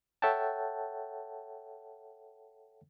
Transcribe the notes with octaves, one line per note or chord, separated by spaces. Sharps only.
A4 C#5 E5 F#5 G5 A5